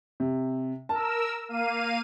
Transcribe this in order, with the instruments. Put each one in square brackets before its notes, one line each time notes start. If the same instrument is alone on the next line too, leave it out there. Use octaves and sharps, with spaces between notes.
[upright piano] C3
[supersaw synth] A#4 E6 [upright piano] A5
[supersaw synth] A#3 F5 D#7